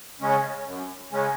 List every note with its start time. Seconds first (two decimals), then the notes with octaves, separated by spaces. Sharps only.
0.21 C#3 G#3 C#4
0.66 F#2
1.11 C#3 G#3 C#4